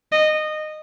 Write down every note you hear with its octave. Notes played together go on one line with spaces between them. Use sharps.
D#5